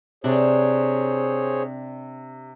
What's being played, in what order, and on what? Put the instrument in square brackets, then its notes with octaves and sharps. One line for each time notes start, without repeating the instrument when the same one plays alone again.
[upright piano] C3 [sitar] D4 [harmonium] G#4 C5 C#5